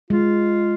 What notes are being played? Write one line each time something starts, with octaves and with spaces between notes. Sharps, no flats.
G#3 F4